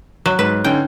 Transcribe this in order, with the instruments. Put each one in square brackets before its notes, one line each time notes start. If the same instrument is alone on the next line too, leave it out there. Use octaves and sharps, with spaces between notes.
[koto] F#3
[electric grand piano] G#2 [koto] B4
[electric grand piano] D3 C#4 D#4 [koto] G5